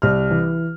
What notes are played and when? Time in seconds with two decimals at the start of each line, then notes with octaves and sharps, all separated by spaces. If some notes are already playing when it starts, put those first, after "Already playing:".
0.02 C2 F6
0.30 E3